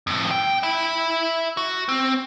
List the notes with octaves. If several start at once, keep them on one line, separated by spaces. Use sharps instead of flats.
F2 A2
G5
E5 B5
F#4
C4